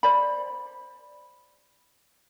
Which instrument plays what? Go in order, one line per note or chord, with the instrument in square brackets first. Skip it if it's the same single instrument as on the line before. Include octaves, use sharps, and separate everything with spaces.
[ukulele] C5 D5 B5